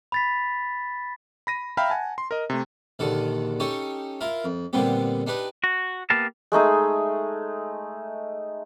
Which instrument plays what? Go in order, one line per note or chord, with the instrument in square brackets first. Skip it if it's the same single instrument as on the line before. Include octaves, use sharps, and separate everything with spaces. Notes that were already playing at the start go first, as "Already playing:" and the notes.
[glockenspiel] B5 A6 B6
[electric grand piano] B5 A#6 D#7
E5 F5 G5 A#5 B5 F6
F#5 G#5 A5
C6
A#4 D#5
C3 A3
[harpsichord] A#1 D#2 D3 D#3 A4
C#4 D#4 G4 A4 C#5
E4 F4 A#4
F2
A#2 D3 G3 B3 C4 G4
D4 D#4 G4 B4
[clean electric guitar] F#4
A#3 B3 G4 B4 F5 A5
[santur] G#3 A3 D#4 G#4